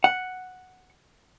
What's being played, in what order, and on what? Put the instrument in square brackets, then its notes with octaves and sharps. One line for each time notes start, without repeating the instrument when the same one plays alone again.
[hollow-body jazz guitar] F#5